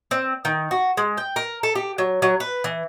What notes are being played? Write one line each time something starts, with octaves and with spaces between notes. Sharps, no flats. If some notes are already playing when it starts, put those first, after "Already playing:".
C4
D#3
F#4
G#3
G5
A#4
A4
G4
F#3
F#3
B4
E3